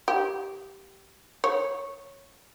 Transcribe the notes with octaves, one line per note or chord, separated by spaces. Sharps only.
G4
C#5